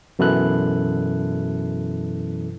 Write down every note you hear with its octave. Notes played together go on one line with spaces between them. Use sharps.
F#2 B2 E3 E4 A4 F#6